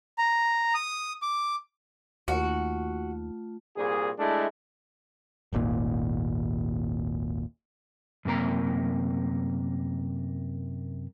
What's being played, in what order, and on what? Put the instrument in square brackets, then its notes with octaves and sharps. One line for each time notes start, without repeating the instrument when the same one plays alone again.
[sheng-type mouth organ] A#5
D#6
D6
[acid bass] D#2 [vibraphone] A3 F4 [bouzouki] F#4
[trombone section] C2 A#2 G#4
G#3 A3 D4 E4
[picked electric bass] D#1 G#1 D#2 A#2
[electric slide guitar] F#2 C3 A#3 A#5